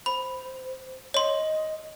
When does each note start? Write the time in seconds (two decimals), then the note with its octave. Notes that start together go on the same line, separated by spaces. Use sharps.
0.06 C5 B5
1.14 C#5 D#5 C6